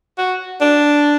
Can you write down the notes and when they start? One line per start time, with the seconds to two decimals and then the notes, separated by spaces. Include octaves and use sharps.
0.18 F#4
0.61 D4